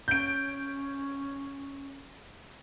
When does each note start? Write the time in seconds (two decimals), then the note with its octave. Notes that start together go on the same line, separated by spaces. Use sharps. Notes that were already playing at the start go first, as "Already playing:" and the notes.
0.08 C#4 G6 D7